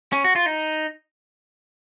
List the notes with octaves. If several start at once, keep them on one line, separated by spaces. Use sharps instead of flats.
C#4
F#4
F4
D#4